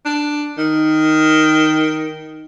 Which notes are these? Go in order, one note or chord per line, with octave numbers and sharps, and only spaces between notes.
D4
D#3